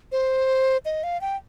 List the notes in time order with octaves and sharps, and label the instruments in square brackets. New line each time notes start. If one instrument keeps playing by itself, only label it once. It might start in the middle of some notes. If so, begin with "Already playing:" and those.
[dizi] C5
D#5
F5
G5